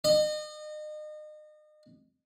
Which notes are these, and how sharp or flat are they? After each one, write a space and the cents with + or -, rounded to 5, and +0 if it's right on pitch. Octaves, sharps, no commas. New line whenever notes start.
D#5 -35